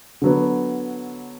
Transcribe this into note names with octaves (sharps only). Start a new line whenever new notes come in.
D3 F#3 B3